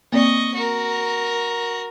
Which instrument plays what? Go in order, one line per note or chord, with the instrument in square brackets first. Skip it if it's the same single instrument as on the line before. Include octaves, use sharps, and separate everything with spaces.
[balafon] A#3 C4 D5 [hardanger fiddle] D#5 C#6
[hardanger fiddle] F#4 A#4